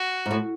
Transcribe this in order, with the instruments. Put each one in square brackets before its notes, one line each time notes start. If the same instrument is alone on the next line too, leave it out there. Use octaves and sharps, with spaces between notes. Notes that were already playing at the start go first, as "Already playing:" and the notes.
Already playing: [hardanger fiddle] F#4
[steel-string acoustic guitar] G#2
A2